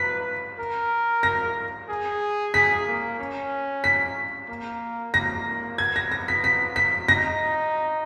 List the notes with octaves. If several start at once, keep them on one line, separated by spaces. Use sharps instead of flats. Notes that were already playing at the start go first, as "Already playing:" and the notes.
Already playing: B4 B6
A#4
A#6
G#4
G#4 B6
A#3
C#4
B6
A#3
A#3 A#6
B3 G#6
A#6
A#6
B6
B6
B6
D#4 A#6